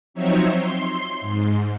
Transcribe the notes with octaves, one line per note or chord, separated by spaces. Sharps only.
F3 F#3 C4 D#4 C#5 E5
C6
G#2